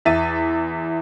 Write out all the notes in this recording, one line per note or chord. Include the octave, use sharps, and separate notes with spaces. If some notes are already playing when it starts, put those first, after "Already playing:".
E2 E5 A6 D#7